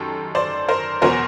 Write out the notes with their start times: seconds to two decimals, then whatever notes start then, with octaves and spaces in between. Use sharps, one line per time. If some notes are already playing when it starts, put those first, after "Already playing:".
Already playing: F#2 D#3 G4 A4
0.35 C5 D5
0.68 A#4 C5
1.02 E2 B2 F#3 A#4 C5